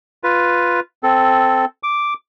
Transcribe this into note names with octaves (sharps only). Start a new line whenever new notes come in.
F4 B4
C4 A4
D6